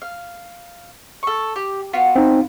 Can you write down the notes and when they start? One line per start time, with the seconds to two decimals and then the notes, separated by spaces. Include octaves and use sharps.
0.02 F5
1.23 A4 C#6
1.56 G4
1.93 B3 F4 F#4
2.16 C4 D#4